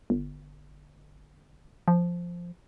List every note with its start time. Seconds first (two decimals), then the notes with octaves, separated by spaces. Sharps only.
0.10 G1
1.88 F3